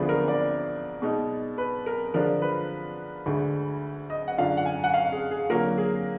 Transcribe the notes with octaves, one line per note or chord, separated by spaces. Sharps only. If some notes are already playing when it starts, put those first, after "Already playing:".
Already playing: D2 D3 F3 B3 D4 G#4
A#4
D5
B2 G#3 D#4
B4
A#4
D3 F3 G#3 D4 F4 A#4
B4
D2 D3 G#3
D#5
F#5
F#2 D3 G#3 D4 F4 F5
F#5
G#5
F#5
F5
G#4
G#4
D3 F#3 A#3 F4 A#4
G#4